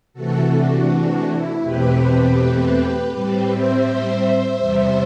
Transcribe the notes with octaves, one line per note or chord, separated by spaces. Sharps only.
C3 E3 A3 F#4 A4
D4 F#4
E4
E2 B2 A3 C4 G4 B4
A2 G3 C4 G4 B4
C5 E5
E2 C3 G3